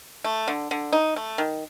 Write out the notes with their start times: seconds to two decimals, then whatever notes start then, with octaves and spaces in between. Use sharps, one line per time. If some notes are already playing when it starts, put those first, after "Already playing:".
0.24 A3
0.48 D3
0.71 D3
0.93 D#4
1.16 A3
1.38 D#3